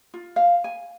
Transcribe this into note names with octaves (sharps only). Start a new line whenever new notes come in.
F4
F5
G#5